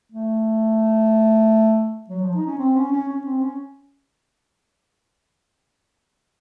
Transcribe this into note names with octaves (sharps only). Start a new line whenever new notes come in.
A3
F#3
F3
D#4
C#4
C4
C#4
C#4
C#4
C4
C#4